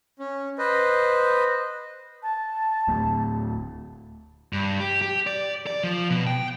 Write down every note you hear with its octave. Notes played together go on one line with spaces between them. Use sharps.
C#4
B4 C5 D#5
A5
D1 A3
G2
G4
G4
D5
D5
F3
B2
G5